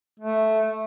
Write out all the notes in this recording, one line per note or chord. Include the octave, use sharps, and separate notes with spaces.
A3